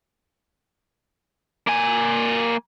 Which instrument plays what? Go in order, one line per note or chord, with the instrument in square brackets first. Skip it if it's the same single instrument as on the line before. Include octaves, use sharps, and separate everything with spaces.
[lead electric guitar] A#3 G#5